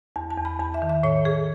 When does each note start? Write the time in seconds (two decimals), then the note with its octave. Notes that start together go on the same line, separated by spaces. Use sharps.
0.16 E2 A5
0.30 A5
0.37 E2
0.45 B5
0.60 E2 A5
0.74 E5
0.82 D#3
0.89 E5
1.03 A2 C#5
1.25 A2 G#4